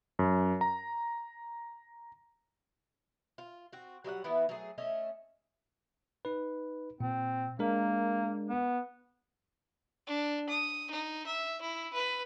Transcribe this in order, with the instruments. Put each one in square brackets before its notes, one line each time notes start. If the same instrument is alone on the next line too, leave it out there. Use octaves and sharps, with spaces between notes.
[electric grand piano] F#2
A#5
[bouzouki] F4
C4 F#4
F#3 G3 D#5 F#5
E3 B3 E4
F#3 A3 G#4
A3 C#4 D#5 E5
[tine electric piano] D#4 B4
[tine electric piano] A#2 [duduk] C4
[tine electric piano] G#3 D4 A#4 [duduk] A#3
[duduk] B3
[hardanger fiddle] D4
D#6
D#4
E5
E4
B4